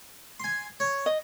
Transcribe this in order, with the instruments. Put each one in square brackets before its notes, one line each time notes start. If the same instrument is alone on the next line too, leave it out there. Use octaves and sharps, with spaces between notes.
[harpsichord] G#5 C6
C#5
[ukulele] D#5